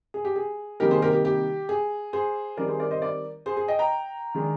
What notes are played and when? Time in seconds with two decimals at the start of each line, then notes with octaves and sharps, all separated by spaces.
0.14 G#4
0.25 G4
0.36 G#4
0.80 C3 D#3 G3 A#3 D#4 G4 A#4
0.91 G#4 C5
1.02 G4 A#4
1.13 G4
1.25 G4
1.69 G#4
2.13 G#4 C5
2.57 D#3 G3 C4 D#4 A#4 D5
2.68 G#4 C5
2.80 A#4 D5
2.91 C5 D#5
3.02 A#4 D5
3.46 G#4 C5
3.57 G#4
3.68 D#5 G5
3.79 G5 A#5
4.35 D#3 G#3 D4